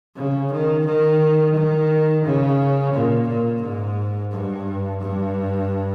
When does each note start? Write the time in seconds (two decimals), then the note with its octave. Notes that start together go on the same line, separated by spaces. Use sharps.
0.17 C#3
0.52 D#3
0.86 D#3
1.55 D#3
2.25 C#3
2.93 A#2
3.28 A#2
3.63 G#2
4.32 G2
5.01 G2